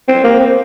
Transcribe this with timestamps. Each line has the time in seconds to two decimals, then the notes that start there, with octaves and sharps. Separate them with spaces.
0.08 C4
0.24 A#3
0.40 C4